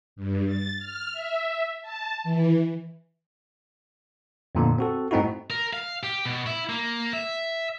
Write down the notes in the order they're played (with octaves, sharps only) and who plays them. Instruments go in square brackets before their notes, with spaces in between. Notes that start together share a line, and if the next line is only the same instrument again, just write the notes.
[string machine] G2
A6
F6
E5
A5
E3
[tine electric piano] F2 A#2 D3 B3
C4 F#4 A4
G#2 A3 C4 D#4 E4 F#4
[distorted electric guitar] A#4
F5
G4
B2
E4
A#3
E5